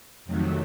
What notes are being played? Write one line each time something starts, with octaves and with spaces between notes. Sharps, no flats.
F2 C3 D#3 F#3 A3